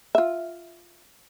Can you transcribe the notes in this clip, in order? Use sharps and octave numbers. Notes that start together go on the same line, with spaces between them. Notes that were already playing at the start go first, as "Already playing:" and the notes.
F4 E5